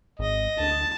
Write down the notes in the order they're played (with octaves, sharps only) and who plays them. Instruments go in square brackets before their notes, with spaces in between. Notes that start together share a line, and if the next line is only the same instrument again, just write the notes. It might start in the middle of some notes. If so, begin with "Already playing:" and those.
[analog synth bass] G#1 [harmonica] D#5
[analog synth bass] D2 [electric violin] A5